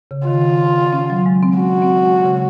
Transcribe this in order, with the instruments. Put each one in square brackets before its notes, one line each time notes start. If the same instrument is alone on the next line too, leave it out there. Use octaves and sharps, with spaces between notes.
[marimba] C#3
[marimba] D#3 [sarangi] F4
[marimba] C#4
F#3
G#3
C4
[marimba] C#4 [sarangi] F#4
[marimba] C4
G#3
C#3